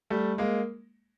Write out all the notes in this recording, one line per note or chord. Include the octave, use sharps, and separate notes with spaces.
G3 A3
G#3 A#3